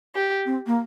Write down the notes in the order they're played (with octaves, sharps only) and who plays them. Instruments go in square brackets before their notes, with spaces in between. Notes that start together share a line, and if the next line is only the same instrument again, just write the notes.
[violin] G4
[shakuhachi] C4
A#3